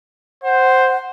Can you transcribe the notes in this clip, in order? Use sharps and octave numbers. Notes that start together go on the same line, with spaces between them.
C5 F#5